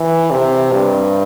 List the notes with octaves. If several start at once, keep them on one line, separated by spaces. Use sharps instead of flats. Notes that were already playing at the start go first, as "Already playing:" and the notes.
Already playing: E3
C3
G2